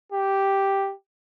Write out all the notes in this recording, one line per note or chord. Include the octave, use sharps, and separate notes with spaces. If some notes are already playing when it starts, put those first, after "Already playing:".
G4